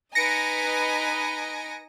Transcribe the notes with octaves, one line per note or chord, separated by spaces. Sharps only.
D#4 B4 D#5 G#5 A#6 C#7 D7